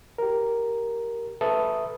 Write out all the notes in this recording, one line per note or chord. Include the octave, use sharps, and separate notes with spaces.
G4 A#4
A4 B4 E5 A5 D#6